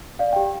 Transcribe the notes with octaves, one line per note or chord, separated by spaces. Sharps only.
D5 F5
G4 G5